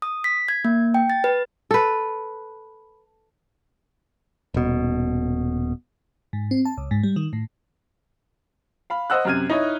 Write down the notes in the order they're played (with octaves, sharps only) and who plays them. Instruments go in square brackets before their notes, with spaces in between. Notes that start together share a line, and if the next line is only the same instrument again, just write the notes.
[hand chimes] D#6
B6
G#6
A#3
G5
A6
B4
[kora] A4 B4
[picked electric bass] D#1 B2
[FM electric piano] G#2
C4
A5
C#2
G#2
G3
D#3
A2
[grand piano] F5 B5
C5 D#5 F#5 E6 F#6
F#2 C3 F6 G#6 D#7
D#4 E4 C#5 D#5